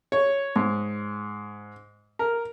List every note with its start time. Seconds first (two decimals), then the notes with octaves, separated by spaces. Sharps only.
0.12 C#5
0.56 G#2
2.19 A#4